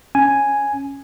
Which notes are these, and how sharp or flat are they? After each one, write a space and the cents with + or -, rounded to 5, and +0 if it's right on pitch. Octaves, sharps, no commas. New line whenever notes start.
C#4 +0 G#5 +0